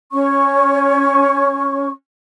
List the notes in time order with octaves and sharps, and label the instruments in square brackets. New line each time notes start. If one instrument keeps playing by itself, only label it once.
[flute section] C#4 C#5 C#6